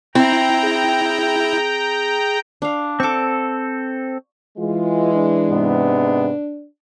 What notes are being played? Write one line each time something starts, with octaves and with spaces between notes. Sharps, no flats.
C4 E4 G5 A#5
G#4
D4 F5
C4 A4 C#6 D6
E3 G#3 F4
D4
G#2 C3 B3